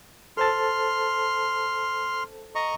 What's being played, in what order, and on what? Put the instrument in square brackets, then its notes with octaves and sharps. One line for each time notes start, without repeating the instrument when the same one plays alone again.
[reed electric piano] A4 C5 A5 [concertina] C6 F6
[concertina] D#5 A#5 C#6